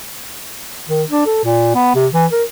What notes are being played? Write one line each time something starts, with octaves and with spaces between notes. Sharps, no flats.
D#3
D4
A4
A#2
B3
C3
E3
A#4